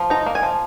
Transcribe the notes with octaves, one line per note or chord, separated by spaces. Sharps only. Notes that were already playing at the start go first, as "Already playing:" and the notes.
Already playing: F3
D#4 A#5
A#3
G#5
F3